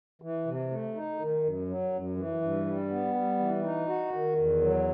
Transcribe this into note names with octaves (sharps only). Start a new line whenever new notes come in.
E3
C3
A3
D#4
D#3
F#2
F#3
F#2
E3
G2
G3
B3
G3
E3
D#4
F#4
D#3
E2
F#3